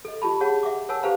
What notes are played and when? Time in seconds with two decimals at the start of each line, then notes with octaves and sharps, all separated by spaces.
0.05 A4 D#5
0.22 F4 G4 A5 B5
0.40 G#4 C#5 F#5 A5
0.63 E5 F#5 D6
0.89 A#4 C#5 F#5 G#5 A5 E6
1.03 G4 A4 B4 C5 F5 A#5